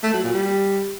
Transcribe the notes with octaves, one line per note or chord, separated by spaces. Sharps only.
A3
F#3
A#2
G3